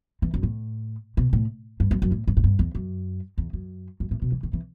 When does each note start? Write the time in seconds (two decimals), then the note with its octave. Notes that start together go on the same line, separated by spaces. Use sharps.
0.22 E3
0.34 F#2
0.43 A2
1.17 B2
1.33 A2
1.80 G2
1.91 F#2
2.02 F#2
2.11 A2
2.27 G2
2.37 A2
2.44 G2
2.59 E2
2.75 F#2
3.38 E2
3.53 F#2
4.00 F#2
4.11 A2
4.22 B2
4.32 E3
4.43 D#3
4.53 E3